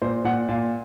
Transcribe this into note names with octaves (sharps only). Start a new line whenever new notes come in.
A#2 C5
A#2 F#5
A#2 F5